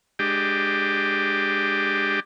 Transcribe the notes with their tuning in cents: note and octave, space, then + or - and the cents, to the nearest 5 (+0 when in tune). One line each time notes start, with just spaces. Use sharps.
G#3 +0 D4 +25 G4 +0